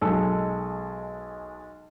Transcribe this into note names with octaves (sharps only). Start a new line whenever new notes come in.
B1 G#3 A4